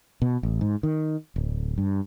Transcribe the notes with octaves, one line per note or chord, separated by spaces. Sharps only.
B2
A1
G#2
D#3
D1
G2